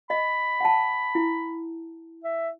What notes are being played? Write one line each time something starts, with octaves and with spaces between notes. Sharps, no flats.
D#5 B5
F#5 G#5 A5
E4
E5